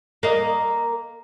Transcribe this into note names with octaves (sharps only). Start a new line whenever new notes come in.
A#3 D#5